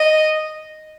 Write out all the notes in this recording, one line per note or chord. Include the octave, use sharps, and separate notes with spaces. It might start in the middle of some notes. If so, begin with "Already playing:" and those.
Already playing: D#5